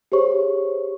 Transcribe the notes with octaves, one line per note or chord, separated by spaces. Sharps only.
G4 G#4 C5 C#5 C#6